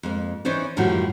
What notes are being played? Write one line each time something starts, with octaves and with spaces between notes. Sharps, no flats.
F2 G#3 A#3
E3 C#4 D#4 C5 D5
F#2 A2 D#3 F3 G3 F#4